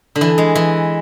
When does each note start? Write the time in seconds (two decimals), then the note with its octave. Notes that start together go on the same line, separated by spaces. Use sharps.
0.15 D3
0.21 E3
0.38 G#3
0.55 E3